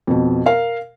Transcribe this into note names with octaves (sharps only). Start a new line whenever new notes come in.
F2 B2
A#4 F5